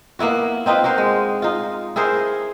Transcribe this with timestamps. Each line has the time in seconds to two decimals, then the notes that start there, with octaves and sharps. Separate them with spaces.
0.19 A#3 B3 E4 F#4
0.66 C4 D#4 F4 B4
0.84 F#4 A#4 C5
0.98 G#3
1.42 D#4 F4
1.96 E4 G#4 A#4 C5